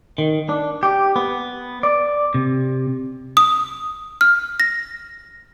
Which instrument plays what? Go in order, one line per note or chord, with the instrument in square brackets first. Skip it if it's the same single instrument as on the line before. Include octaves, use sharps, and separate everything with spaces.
[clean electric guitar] D#3
D4
G4
B3
D5
C3
[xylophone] D#6
F6
A#6